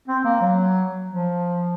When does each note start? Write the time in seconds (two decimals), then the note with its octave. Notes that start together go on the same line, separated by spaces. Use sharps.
0.08 C4
0.25 A#3
0.41 F#3
1.08 F3